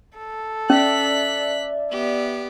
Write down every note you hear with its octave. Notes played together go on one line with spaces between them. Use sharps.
A4
C#4 D5 E5 F#6 B6
B3 G4